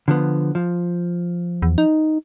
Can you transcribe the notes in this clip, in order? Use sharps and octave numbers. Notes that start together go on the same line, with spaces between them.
D3 F3 B3
F3
E2
D#4